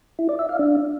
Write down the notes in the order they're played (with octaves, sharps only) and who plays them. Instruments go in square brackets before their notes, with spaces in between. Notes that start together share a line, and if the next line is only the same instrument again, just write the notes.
[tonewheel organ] E4
D5
E5
F5
D4